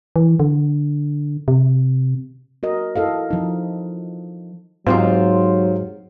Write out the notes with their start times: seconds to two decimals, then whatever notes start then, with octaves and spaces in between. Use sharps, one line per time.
0.16 E3
0.40 D3
1.48 C3
2.63 F#4 A#4 D#5
2.96 E4 A4 D#5 F5
3.31 F3 D#4
4.87 G#2 F#3 C4 D#4 F4 G4 F5